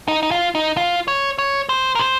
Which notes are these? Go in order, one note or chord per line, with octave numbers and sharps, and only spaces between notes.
D#4
D#4
F4
D#4
F4
C#5
C#5
C5
A#4
C5